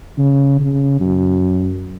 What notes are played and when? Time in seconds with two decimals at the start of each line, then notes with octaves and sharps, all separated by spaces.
0.19 C#3
0.60 C#3
1.00 F#2